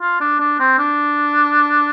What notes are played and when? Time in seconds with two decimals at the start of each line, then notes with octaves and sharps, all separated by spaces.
0.01 F4
0.20 D4
0.40 D4
0.60 C4
0.79 D4